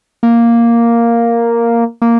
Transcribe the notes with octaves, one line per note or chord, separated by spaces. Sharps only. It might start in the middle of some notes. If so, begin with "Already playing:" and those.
A#3
A#3